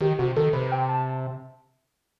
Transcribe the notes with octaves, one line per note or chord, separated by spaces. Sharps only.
D#3 G4
C3 F#4
D#3 A4
C3 B4
G5
A5